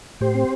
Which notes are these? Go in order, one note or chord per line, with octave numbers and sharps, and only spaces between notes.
A2 G4 C5
C4